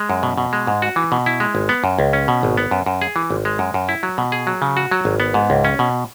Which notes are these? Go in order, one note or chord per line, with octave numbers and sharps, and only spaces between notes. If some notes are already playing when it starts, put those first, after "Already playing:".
Already playing: G#3
F#2
B2
B2
G#3
G#2
F#4
E3
B2
E4
G#3
G#1
B3
F#2
C#2
C#4
B2
G#1
B3
F#2
F#2
G#4
E3
G#1
G#3
F#2
F#2
E4
F#3
B2
G#4
F#3
C#3
F#4
F#3
G#1
B3
G#2
C#2
C#4
B2